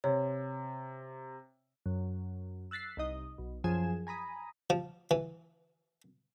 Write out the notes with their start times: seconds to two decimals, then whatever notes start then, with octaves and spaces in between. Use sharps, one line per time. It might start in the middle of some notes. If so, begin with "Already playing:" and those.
0.04 C3 C#5
1.86 F#2
2.71 E6 F#6 A6 B6 C7
2.97 C2 D#4 D#5
3.38 B1
3.64 F#2 F3 G#4 G#5 G#6 E7
4.07 G#5 A#5 B5 D#6
4.70 F3
5.11 E3